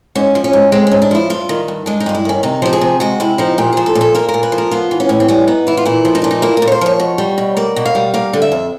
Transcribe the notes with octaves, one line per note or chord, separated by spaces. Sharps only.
G#2 C#4
F3
C#4
G#2
G#3 C4
G#2 C#4
D4
F3 E4
G2 F4
D#3
G2
G#3 D4
D#4
G2 F4
E4
D#3 C#4
C3 D#4
F3 G4
G#4
C3
G#3 F#4
C3 E4
F3 D#4
A#2 G4
F3 G#4
A4
A#2
A4
A#3 A#4
A#4
A#2
B4
F3
A#4
B3 F4
E3
C#4
A2
C4
G3 C#4
B3 D#4
E3 E4
F4
A#2 E4
F3
D#4
A#2 D4
D#4
A#3 E4
A#4
A#2
C#5
C5
F3 C#5
B2
G3
B2
A#3 D5
B2
F5
G3
A#3 F5
D3
E5
F2